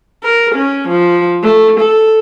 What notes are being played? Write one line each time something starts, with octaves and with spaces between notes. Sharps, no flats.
A#4
C#4
F3
A3
A4